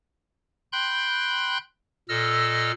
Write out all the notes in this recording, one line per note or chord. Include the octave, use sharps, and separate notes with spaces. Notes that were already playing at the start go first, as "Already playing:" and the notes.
G5 B5 C6 F#6 G6
A#2 A4 D#5 E6 F6